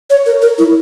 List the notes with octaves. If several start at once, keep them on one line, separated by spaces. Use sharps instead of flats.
C#5
A#4
A#4
E4